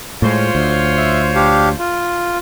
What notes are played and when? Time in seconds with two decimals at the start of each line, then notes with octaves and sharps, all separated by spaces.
0.22 A2 G#3 F4 C5 C#5
0.55 D2
0.97 E5
1.35 D4 G4 F5
1.79 F4